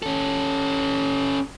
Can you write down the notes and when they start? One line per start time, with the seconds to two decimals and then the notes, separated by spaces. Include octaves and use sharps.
0.03 C#4 A4